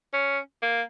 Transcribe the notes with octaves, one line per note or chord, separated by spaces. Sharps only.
C#4
A#3